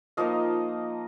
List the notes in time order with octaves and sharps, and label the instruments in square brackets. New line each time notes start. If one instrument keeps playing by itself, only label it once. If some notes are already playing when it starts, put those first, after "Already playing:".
[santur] F3 A#3 D#4 D#5 F5